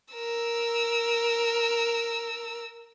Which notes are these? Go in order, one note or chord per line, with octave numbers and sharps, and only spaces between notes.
A#4 E6